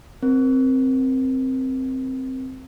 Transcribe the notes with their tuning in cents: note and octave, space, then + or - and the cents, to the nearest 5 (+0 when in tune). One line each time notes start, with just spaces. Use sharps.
C4 +0 A#4 +20